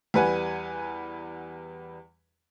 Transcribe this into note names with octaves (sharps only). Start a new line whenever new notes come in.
E2 G3 B4 F#5 G#5